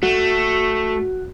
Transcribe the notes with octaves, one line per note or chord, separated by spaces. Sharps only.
A3 F#4